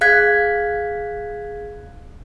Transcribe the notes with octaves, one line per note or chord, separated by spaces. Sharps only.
G#4 F5 F#6 G#6 B6